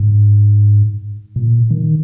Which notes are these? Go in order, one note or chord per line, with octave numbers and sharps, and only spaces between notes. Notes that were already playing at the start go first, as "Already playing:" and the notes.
Already playing: G#2
A#2
D#3